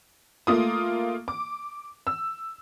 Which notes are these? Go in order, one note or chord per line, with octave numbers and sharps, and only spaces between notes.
A3 A#3 F4 D#6
D6
E6